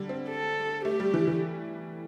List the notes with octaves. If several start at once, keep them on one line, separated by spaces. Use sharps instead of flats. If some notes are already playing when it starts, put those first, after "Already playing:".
Already playing: D3 G3
C4
A4
A3 G4
G3
E3
E3